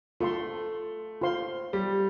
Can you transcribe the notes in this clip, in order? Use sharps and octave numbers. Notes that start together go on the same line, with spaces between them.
A3 F4 A4 F5 C6
F4 C5 F5 C6
G3